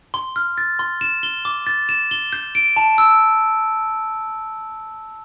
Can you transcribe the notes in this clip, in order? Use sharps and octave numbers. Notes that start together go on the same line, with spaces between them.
C6
F6
A6
C6
E7
G7
D6
A6
E7
G7
G6
D7
A5
E6